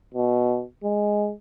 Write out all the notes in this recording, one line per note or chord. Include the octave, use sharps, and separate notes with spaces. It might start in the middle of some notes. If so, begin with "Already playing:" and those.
B2
G#3